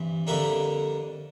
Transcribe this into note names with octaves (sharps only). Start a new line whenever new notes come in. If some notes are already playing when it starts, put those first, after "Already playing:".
Already playing: G2 E3 C4
F2 D3 G3 A#3 D4 E5 G5